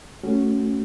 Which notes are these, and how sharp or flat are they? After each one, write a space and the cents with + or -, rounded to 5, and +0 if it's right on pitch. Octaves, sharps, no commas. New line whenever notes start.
A3 +5 C#4 +0 F#4 +0